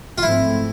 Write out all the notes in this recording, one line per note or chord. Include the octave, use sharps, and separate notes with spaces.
F4
G#2 F3 A3 C4 E4